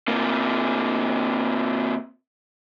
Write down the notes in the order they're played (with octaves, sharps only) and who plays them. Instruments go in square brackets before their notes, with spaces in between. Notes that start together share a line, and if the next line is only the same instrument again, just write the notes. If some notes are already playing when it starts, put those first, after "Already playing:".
[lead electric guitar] C3 A#3